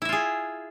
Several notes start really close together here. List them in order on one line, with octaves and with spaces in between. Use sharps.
E4 E5 F4 G#4